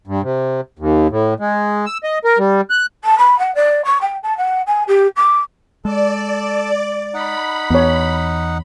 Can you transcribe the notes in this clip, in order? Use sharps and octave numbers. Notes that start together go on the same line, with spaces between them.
G2
C3
D#2
A2
G#3
E6
D#5
A#4
G3
F#6
A5
B5
F#5
D5
C#6
G5
A5
F#5
G#5
G4
D6
G#3 A4 D5
D#4 F#5 B5
E2 E3 B3 C#5